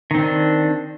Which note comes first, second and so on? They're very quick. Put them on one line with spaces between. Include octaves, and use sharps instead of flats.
D#3 C4 D4